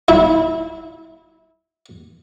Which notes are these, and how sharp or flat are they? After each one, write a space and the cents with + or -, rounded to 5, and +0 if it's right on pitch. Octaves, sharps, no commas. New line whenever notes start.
E4 -25